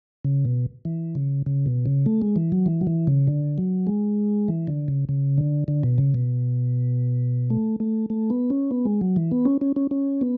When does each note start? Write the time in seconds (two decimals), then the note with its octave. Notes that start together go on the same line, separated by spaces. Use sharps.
0.25 C#3
0.45 B2
0.85 E3
1.15 C#3
1.46 C#3
1.66 B2
1.86 C#3
2.06 A3
2.22 G#3
2.36 E3
2.52 F#3
2.66 E3
2.81 F#3
2.87 E3
3.07 C#3
3.27 D3
3.58 F#3
3.87 G#3
4.48 E3
4.67 D3
4.88 C#3
5.09 C#3
5.38 D3
5.68 D3
5.83 B2
5.98 C#3
6.14 B2
7.50 A3
7.80 A3
8.10 A3
8.30 B3
8.50 C#4
8.71 B3
8.85 G#3
9.01 F#3
9.16 E3
9.31 B3
9.45 C#4
9.61 C#4
9.76 C#4
9.91 C#4
10.21 B3